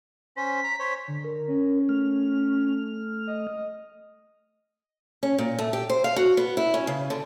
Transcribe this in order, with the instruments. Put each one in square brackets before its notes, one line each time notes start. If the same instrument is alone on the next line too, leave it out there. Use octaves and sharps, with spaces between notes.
[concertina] C#4 C5 [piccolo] B6
[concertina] A#5
C5 C#5
[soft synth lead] D3
[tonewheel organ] A#4
[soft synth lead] C#4
[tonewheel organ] A3 F6
[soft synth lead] D#5
[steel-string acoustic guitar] C#4
A#2
A3
G4
C5
F5
F#4
B3
E4
C#4
C#3
D3